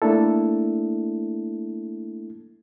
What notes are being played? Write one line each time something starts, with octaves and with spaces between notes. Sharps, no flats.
A3 A#3 D4 E4 A4